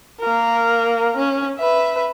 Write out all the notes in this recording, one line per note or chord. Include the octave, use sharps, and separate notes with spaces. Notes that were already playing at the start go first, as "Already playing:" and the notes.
A#3 A#4
C#4
B4 E5